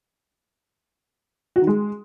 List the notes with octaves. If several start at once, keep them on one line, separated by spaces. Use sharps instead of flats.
F#4
D#3
G#3